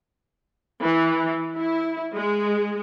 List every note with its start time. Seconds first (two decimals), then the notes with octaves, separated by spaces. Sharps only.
0.83 E3
1.56 E4
2.15 G#3